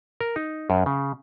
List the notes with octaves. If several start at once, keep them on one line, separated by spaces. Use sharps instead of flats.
A#4
D#4
F#2
C#3